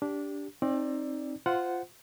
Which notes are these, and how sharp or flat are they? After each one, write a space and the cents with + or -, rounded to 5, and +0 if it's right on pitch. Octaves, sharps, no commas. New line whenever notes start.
D4 -15 G4 +0
C4 +30 D#4 +0 D5 +0
F4 +0 C5 -15 F#5 +0